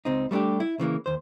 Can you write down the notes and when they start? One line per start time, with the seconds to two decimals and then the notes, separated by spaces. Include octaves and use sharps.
0.05 C#2 C4 D#4
0.31 G3 A3 B3 D4 G4
0.60 E4
0.79 C#3 E3 G#3 A#3
1.06 D#2 C5